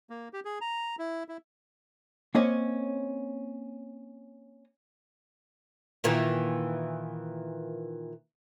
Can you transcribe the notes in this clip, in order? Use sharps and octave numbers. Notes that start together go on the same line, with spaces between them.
A#3
G4
G#4
A#5
E4
E4
A#3 C4 C#4 C#5 D#5
A#2 D#3 E3